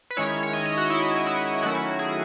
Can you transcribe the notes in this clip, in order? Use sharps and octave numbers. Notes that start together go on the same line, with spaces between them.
B4
D#3 G#3 C#4 E4 C#5
C#5
D#5
D#5
F#4
E4
E4
D#3 F#3 A3 C#4 E4 F#4
G#4